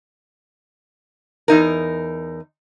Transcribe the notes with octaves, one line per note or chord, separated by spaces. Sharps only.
E2 D#4 A#4